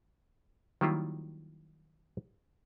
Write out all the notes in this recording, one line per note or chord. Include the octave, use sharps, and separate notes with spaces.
D#3 F#3 G3 A#3 E4 F4